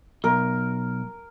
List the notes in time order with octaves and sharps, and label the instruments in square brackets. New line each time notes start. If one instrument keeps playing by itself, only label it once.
[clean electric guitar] B1 [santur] A#4